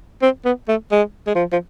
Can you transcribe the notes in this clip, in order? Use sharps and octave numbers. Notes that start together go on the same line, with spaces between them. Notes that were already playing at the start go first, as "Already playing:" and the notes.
C4
B3
A3
G#3
G#3
F3
F3